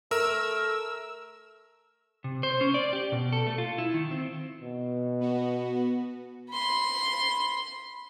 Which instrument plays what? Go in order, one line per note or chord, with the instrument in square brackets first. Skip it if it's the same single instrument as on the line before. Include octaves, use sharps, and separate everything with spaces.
[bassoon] A3 [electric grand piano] A#4 [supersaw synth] E6
[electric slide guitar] C3
C5
C#4
D5
G4
B2
A4
A3
F4
E4
D#3
C4
[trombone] B2
[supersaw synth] B3 F#4
[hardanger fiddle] B5 C6